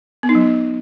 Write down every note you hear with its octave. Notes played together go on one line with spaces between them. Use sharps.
B3
D#4
F#3